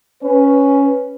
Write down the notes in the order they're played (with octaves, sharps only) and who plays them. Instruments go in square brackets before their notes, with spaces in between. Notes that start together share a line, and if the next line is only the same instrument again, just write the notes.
[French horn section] C#4 B4